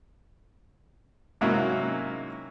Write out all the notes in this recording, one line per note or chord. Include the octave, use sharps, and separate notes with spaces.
G#2 C3 F#3 A#3 C#4 E4